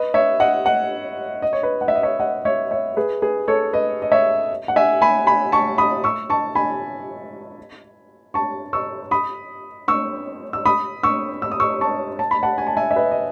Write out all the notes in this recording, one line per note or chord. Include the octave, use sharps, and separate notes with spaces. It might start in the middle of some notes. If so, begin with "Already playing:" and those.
Already playing: B4 D#5
C#5 E5
D#5 F#5
D#5 F#5
D#5
C#5
B4 D#5
F#5
E5
D#5
C#5 E5
D#5 F#5
C#5 E5
C#5 E5
G#4 B4
G#4 B4
A4 C#5
B4 D#5
D#5
C#5 E5
F#5
E5 G#5
G#5 B5
G#5 B5
A5 C#6
B5 D#6
C#6 E6
A5 C#6
G#5 B5
A5 C#6
C#6 E6
B5 D#6
C#6 E6
E6
B5 D#6
C#6 E6
E6
D#6
C#6 E6
A5 C#6
A5
B5
F#5 A5
G#5
A5
E5 G#5
E5
B4 D#5
D#5